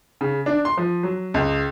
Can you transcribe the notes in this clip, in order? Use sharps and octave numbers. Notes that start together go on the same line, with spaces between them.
C#3
D4
C6
F3
F#3
C#2